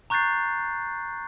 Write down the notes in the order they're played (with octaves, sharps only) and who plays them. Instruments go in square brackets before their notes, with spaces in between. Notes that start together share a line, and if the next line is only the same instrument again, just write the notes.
[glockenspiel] A#5 C#6 F#6 G6 A6 C7